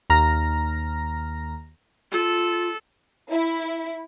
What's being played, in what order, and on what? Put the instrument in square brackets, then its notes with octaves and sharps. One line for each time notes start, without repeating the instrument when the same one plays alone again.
[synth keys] D#2 A#5 F6 A#6
[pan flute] F4 [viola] A4
[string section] E4